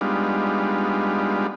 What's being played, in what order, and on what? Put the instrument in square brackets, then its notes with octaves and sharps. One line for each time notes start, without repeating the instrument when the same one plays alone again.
[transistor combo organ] G3 G#3 B3 D4 D#4 F4